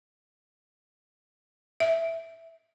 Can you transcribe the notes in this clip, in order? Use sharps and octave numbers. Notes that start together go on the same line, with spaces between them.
E5